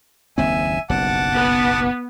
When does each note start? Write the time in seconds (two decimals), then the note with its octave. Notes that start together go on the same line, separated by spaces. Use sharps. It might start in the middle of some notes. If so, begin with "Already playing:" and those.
0.38 F#1 D#2 C4 E5 G#5
0.90 F#1 B1 G2 F#5 A5 D6
1.34 B3